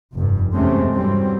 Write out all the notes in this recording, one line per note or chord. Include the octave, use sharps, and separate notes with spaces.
F1 G2
E2 C3 G#3 A3 C4 C#4
G2 E3 F#3 G3 C4